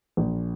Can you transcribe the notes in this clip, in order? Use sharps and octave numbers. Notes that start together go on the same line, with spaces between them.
A#1